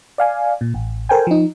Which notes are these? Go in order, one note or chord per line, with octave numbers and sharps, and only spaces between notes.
D5 F5 G#5
A#2
A1
A4 A#4 C5 G5 G#5
F3 D#4